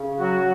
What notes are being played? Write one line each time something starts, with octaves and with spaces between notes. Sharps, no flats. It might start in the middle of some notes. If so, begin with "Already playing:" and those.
Already playing: C#3
F#3 F#4